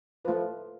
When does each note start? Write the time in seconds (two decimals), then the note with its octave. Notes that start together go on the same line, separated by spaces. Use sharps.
0.25 F3 A3 F4 B4